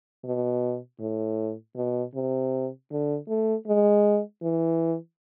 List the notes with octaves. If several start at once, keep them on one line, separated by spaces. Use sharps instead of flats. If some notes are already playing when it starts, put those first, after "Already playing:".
B2
A2
B2
C3
D3
A3
G#3
E3